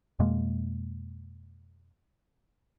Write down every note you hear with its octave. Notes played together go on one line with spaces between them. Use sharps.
F2 B2 G#3 A#3